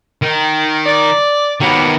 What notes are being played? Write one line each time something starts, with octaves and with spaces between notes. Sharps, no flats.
D#3
D5
D#3 F#3 A#3 B3 G4